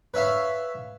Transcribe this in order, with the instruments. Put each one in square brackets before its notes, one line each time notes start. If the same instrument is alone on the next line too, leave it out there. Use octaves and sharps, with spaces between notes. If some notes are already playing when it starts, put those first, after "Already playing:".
[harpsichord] B4 C#5 E5 F5 B5